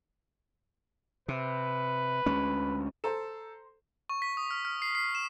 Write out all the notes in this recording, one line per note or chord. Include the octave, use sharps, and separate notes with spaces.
C3 B4
D2 G#3 C#4
A4 C5 A#5 E7
C#6
B6
D#6
F6
F6
C7
C7
E7